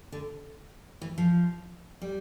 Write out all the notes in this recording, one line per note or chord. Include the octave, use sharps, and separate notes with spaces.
D3
E3
F3
G3